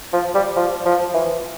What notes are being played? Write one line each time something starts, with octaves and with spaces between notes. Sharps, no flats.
F3
G3
F3
F3
E3